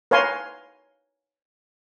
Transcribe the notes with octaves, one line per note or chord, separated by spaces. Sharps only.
A#4 B4 C#5 F5 G#5 C6